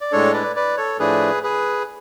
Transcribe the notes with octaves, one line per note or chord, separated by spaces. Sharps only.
D5
A2 G#3 D4 A4 C#5
B4 D5
B4 D5
A4 C#5
A2 F3 A3 D4 G#4 B4
G#4 B4